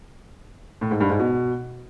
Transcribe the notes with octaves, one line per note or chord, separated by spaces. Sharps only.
A2
G#2
G2
G#2
B2